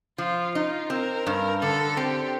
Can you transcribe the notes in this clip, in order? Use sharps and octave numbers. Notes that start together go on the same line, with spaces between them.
F3 F4
D#4 F4
C4 A#4
G2
D3 A4
C4 G4